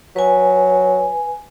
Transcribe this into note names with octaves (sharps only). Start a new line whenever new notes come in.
F#3 B4 G#5